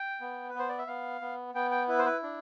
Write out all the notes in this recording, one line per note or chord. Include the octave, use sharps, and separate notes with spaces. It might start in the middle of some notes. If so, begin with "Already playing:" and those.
Already playing: G5
B3
B4
B3 C5
D5
E5
B3 F5
B3
B3 G5
G5
E4 B4
C5
B4
D4